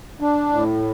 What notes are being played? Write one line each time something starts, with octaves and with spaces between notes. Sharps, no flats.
D4
A2